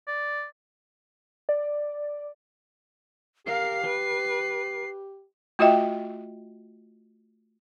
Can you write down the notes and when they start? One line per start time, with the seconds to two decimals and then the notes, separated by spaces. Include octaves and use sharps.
0.08 D5
1.49 D5
3.46 G4 A#4 F5 C7
3.84 B4
5.59 A3 F4 F#4 D#5 E5 G5